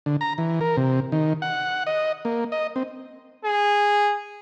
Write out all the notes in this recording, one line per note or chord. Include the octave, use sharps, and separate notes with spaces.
D3
A#5
E3
A#4
C3
D#3
F#5
D#5
A#3
D#5
C4
G#4